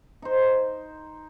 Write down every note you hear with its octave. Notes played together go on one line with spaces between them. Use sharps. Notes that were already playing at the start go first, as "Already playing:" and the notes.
D#4 C5